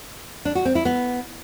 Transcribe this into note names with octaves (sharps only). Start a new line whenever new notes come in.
D4
F#4
C4
E4
B3